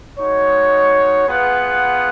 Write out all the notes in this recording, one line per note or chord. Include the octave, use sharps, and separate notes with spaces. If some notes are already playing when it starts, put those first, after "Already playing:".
G#3 D#4 F#4 C#5
B3 F4 G#4 B4 F#5